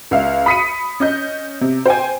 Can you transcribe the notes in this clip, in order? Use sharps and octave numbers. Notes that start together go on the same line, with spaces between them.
C#2 E5 F5
B5 D#6 B6 C#7 D#7
C#4 D#5 G6
C3
C5 G5 G#5